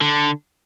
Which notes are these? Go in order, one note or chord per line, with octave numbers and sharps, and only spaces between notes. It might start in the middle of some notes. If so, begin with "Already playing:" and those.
D3